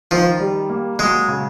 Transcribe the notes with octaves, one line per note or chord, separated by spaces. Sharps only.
D#3 F3
G3
A#3
F#3 G#3
C#3